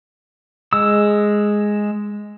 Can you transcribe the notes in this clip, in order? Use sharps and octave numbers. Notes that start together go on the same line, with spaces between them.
G#3 E6